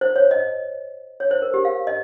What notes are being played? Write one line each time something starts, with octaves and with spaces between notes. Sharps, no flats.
C5
C#5
D#5
C#5
C5
A#4
G4
F5
D#5